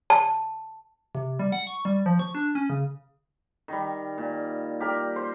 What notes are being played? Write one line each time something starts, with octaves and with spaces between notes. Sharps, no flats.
A5
C3
G3
F#5
C#6
G3
F3
C#6
D4
C#4
C#3
D#3 G3
A#2
G4 A#4 D5
C5